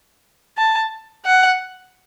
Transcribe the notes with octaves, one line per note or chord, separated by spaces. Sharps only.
A5
F#5